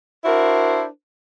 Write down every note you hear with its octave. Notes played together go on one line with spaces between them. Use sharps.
D4 E4 F#4 A#4 C5